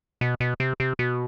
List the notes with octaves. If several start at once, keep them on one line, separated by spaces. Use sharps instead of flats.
B2
B2
C3
C3
B2